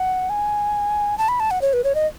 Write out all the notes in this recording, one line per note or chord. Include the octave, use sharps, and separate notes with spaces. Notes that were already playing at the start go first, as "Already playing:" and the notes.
Already playing: F#5
G#5
A5
B5
A5
F#5
C#5
B4
C#5
D#5